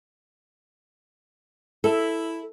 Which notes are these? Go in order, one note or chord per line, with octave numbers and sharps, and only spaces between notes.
E4 A4